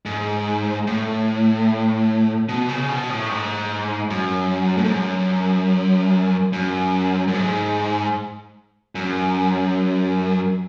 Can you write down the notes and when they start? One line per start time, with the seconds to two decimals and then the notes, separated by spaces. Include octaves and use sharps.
0.06 G#2
0.87 A2
2.49 B2
2.68 C#3
2.89 B2
3.10 A2
3.29 G#2
4.10 F#2
4.77 A2
4.84 G#2
4.91 F#2
6.53 F#2
7.28 F#2
7.34 G#2
8.95 F#2